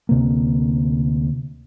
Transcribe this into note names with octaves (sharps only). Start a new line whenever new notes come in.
D2 C3 A#3